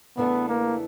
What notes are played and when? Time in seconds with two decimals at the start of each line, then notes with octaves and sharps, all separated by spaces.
0.17 E2 C#3 E3 A3 B3 D4
0.49 A#3